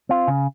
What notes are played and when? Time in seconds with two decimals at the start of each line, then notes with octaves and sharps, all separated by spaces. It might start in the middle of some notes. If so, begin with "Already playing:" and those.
0.09 C4 F4
0.28 C#3